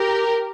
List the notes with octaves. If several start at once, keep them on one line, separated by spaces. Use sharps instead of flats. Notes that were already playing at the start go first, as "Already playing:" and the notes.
Already playing: G4 A#4